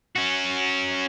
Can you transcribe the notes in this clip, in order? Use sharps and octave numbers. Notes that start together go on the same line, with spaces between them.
C#4 F#4